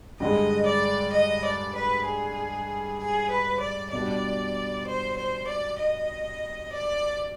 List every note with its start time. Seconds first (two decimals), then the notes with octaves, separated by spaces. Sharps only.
0.20 G2 D3 G#3 D#5
0.67 D5
1.14 D#5
1.45 D5
1.76 B4
2.06 G#4
3.00 G#4
3.31 B4
3.62 D5
3.93 B2 G3 D4 D5
4.87 C5
5.18 C5
5.48 D5
5.80 D#5
6.73 D5